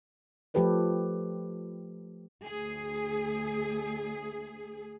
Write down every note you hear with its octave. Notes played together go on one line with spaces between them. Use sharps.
F3 A3 G4 A4 B4 D5
D2 G#4